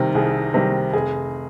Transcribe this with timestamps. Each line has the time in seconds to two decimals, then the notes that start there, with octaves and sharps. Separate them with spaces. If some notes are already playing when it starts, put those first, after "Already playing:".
Already playing: C3 D#3 G3
0.15 C2 G#4
0.54 C3 D#3 G3
0.93 F1 G#4